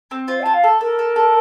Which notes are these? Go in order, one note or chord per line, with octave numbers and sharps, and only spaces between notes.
C4
F4 C5
F4 A5
F5
A4
A4 A#4
A4
A4